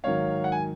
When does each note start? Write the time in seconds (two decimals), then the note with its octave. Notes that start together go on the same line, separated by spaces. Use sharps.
0.04 G#2 D#3 F#3 C#5 F5
0.44 F#5
0.52 G#5